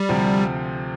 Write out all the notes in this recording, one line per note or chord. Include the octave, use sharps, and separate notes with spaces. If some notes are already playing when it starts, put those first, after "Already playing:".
Already playing: G3
D2 C3 F3 C4